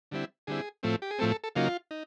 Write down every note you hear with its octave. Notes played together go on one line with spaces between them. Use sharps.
D3 G3 C4 E4
D3 G3 C4 E4 G#4
A2 F3 A3 C4
G4
G#4
A2 F3 A3 C4 A4
A4
A4
C#3 F#3 A#3 D#4 F4
D#4